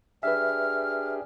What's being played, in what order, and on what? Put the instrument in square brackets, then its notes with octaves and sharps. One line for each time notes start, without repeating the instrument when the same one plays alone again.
[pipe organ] D4 G4 G#4 [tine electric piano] B4 E5 [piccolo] F6